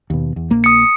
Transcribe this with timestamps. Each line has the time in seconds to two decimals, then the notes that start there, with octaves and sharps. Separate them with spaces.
0.10 D#2 B2
0.36 E2
0.50 A#1 A#3
0.64 D#6 C#7